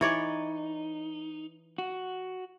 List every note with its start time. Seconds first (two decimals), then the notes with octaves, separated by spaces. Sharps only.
0.01 E3 D#4 C#5 D5
1.78 F#4